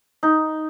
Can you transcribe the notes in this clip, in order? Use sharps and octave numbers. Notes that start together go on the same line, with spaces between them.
D#4